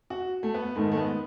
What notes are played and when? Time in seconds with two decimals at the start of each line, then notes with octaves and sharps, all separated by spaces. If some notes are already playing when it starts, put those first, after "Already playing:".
0.10 F#4
0.43 A3
0.54 B3
0.76 G#2 D#3 A3
0.92 A3
0.97 B3